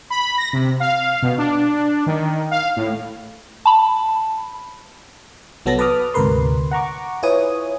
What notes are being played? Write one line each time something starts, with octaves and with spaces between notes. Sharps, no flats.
B5
A#6
C3
F5
B2
D4
D#3
F5
A2
A5 B5
C2 F#3 B3 A4 A6 A#6
B4 A5 B5 D6 D#6 F6
D2 G#2 C3 A#4 B4 C6
F#5 A#5 C#6 D6
E4 F4 B4 C#5 G#5 D#6